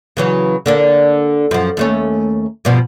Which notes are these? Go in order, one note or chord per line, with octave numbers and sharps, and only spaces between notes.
C#3 E3 F#3
D3 A#3 D4
F#2 F3
D#2 A3 C#4
G2 B2 F3